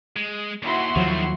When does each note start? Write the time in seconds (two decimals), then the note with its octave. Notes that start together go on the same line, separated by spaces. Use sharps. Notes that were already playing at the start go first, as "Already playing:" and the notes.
0.16 G#3
0.63 D#2 E4 F#4 C6
0.96 D#2 D#3 F3 F#3 A3